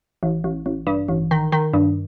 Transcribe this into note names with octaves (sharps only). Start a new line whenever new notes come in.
A1
A1
A1
G2
A1
D#3
D#3
G2